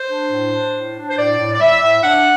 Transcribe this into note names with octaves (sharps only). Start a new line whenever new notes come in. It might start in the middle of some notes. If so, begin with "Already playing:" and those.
Already playing: C5
D4
A2
D4
A2
D4
C5
A2 D5
A2
D5
G3 E5
A2
D4 F#5